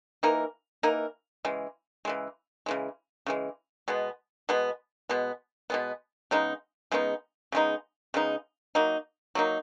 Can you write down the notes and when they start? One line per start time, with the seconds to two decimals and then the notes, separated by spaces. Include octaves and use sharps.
0.23 E3 A#3 D#4 A#4
0.83 E3 A#3 D#4 A#4
1.45 C#3 E3 G#3
2.05 C#3 E3 G#3
2.66 C#3 E3 G#3
3.26 C#3 E3 G#3
3.88 B2 G#3 B3
4.49 B2 G#3 B3
5.09 B2 G#3 B3
5.70 B2 G#3 B3
6.31 C#3 G#3 B3 D#4
6.92 C#3 G#3 B3 D#4
7.52 C#3 G#3 B3 D#4
8.14 C#3 G#3 B3 D#4
8.75 F#3 A#3 D#4
9.35 F#3 A#3 D#4